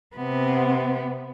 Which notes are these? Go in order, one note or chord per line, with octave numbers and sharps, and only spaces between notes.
C3 B3